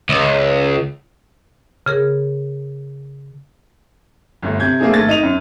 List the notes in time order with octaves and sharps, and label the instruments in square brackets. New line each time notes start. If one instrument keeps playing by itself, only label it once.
[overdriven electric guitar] C#2
[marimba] C#3 G#4 A#4
[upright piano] G1 D2
C3 G6 G#6
A3 A#3 C4 D4 G#4
G#1 A3 A6
D#4 D#7 F7
F#2